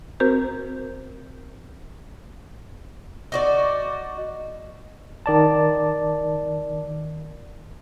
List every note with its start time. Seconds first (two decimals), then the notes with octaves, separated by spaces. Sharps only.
0.20 C4 F#4 A#4 C5 G6
3.32 D#4 F#4 D5
5.26 D#3 D5 A5